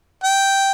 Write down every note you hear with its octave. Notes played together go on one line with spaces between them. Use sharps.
G5